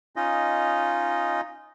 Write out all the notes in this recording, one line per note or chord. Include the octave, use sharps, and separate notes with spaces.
C#4 D#4 F4 D#5